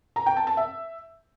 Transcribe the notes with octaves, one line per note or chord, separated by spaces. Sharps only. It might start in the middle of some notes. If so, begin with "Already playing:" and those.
A#5
G5
A5
A5
E5